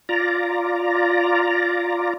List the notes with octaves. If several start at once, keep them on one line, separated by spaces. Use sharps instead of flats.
F4 D5 A#5